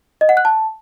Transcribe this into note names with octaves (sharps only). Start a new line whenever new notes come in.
D#5
F#5
F#6
A5